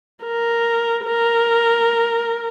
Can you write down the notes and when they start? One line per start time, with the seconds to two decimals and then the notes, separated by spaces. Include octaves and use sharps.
0.24 A#4
1.04 A#4